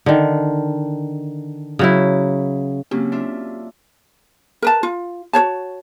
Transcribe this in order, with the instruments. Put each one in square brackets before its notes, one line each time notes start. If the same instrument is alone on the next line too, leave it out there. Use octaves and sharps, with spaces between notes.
[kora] D3 D#3
C#3 F#3 E4
[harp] C#3 F#3 A#3 [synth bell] C4 C#4 G4
[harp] D4 F4 E5
[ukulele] A#4 B4 A5
F4
F#4 C5 C#5 A5